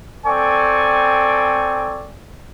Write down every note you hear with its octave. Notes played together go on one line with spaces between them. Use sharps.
C4 A4 D5 G5 G#5 C#6